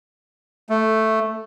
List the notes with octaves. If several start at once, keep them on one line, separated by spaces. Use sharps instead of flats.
A3